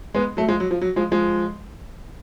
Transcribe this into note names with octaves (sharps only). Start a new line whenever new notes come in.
G#3 B3
F#3 A3
F3 G#3
F#3
F3
F#3
F3 G#3
F3 G#3